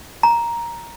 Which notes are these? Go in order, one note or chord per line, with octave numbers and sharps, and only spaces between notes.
A#5